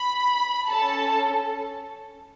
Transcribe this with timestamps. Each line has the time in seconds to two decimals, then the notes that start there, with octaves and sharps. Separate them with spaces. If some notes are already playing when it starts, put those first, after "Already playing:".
Already playing: B5
0.68 C#4 A4 A5